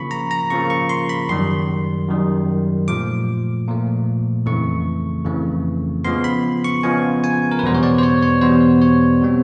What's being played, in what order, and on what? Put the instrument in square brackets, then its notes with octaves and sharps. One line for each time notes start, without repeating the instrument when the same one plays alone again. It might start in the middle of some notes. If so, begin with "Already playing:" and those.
Already playing: [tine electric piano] C#3 F3 A#3 B5 C#6
A#5
A#5
C#3 F3 A#3 C#6
C#6
C6
B5
F#2 D#3 G3 C6
F#2 D#3 G3
A#2 F3 A3 D6
A#2 F3 A3
F2 C#3 E3 A3 C#6
F2 C#3 E3 A3
C#3 F3 G#3 B3 C6
B5
C#6
C#3 F3 G#3 B3 G#5
G#5
A#4
B4
E2 B2 G3 B3 C5
C#5
D5
C5
C#5
C#5
E2 B2 G3 B3 C5
C#5
B2 G3 C4